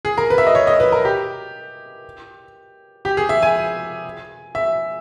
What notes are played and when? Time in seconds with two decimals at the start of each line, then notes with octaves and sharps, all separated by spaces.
0.05 G#4
0.18 A#4
0.30 B4
0.38 E5
0.47 D#5
0.55 C#5
0.67 D#5
0.80 B4
0.92 A#4
1.05 G4
3.05 G4
3.17 G#4
3.29 E5
3.42 G#5
4.55 E5